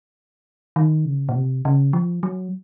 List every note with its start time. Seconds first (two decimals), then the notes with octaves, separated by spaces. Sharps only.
0.76 D#3
1.05 C#3
1.29 A#2
1.35 C3
1.65 C#3
1.93 F3
2.23 F#3